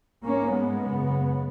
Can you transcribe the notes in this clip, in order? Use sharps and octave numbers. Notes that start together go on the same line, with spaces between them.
G#2 A#3 C#4
G#3 B3
F#2 C#3